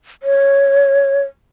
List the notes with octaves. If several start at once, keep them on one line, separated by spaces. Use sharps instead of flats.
C#5